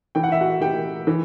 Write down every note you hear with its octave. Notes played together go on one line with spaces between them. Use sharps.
E3 G5
F#5
E5
F#4 F#5
E3 G4 G5
E3